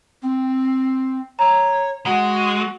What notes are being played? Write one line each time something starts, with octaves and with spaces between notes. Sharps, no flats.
C4
C#5 A#5
G#3 F#4 F#5